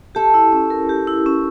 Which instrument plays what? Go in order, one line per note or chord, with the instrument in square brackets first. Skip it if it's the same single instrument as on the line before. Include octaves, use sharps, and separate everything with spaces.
[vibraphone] G4 [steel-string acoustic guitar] A4
[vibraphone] E4
C#4
A#4
G4
E4
C#4